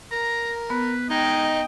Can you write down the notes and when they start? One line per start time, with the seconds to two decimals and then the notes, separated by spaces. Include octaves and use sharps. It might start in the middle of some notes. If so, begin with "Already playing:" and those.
0.12 A#4 A#5
0.70 B3 B4
1.10 G#3 D#4 D#5 G5